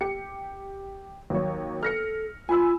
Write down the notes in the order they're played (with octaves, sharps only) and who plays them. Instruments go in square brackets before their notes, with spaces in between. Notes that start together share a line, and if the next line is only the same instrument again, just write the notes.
[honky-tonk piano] G4 C#7
D#2 F#3 C#5
[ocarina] A4 [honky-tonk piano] F6 A#6 C#7
[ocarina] F4 [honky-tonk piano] G#5 B5 E6